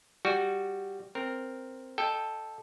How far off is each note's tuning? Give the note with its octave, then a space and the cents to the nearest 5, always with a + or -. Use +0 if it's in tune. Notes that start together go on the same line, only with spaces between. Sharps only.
G3 +0 F#4 +0
C4 +0 A#4 +0
A4 +0 D#5 -20 G5 +10